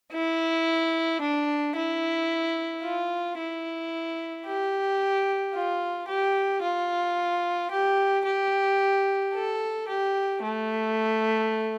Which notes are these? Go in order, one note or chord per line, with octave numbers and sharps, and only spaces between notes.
E4
D4
E4
F4
E4
G4
F4
G4
F4
G4
G4
A4
G4
A3